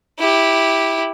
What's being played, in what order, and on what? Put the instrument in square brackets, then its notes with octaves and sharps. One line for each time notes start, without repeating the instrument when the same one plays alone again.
[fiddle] E4 G4